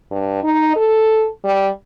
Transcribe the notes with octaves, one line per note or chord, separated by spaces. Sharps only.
G2
D#4
A4
G3